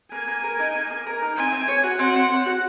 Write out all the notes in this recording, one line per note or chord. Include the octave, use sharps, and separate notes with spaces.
A#3 G#5
A#3
A#4
D#4
A#3
A#3
A#4
D#4
C4 G#5
C4
C#5
F#4
C4 F#5
C4
C#5
F#4